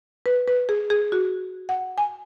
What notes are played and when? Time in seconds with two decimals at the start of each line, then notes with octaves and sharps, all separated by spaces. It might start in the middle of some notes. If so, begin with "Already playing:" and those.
0.26 B4
0.48 B4
0.69 G#4
0.90 G#4
1.12 F#4
1.69 F#5
1.98 G#5